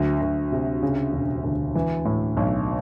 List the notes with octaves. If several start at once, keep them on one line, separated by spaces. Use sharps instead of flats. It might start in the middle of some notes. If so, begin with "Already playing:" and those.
Already playing: D2 F#3
D2
C3
C#3
E1
D2
E3
A2
B1